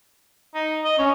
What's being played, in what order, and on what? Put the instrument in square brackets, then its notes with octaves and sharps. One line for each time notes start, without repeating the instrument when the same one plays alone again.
[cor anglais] D#4
D#5
[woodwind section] C#4 [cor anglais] C#5